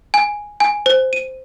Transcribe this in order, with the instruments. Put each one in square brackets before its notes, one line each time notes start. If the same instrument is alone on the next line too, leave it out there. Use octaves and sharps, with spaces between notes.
[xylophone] G#5
G#5
C5
D#7